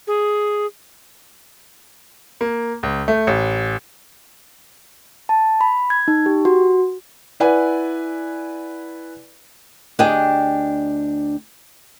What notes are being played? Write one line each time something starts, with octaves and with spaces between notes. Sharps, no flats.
G#4
A#3
C#2
A3
A1
A5
B5
G#6
D#4
G4
F#4
E4 B4 D5 F#5 G#5
D2 D4 G4 G#4 D#5 G5